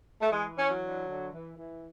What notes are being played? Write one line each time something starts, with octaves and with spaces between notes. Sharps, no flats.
A3
E3 G#3
E3 C#4
F#3
D3
D3
E3
E3